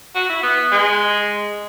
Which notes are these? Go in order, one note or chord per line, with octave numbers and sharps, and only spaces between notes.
F#4
E4
B3
G#3